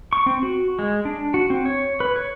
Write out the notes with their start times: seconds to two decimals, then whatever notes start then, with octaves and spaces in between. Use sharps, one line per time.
0.13 C#6
0.26 C4
0.43 F#4
0.79 G#3
1.05 D4
1.34 F#4
1.50 C4
1.65 C#5
2.00 B4
2.16 C#5